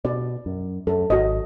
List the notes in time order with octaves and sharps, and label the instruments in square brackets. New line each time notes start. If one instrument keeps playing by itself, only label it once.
[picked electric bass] B2 [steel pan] D5
[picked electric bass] F#2
[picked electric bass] F#2 [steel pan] A4
[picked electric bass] G#1 [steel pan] F#4 D#5